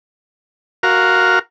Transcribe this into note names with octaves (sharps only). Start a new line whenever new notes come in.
F#4 A#4 F5